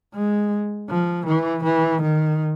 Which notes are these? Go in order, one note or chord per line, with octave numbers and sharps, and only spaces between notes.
G#3
F3
E3
E3
D#3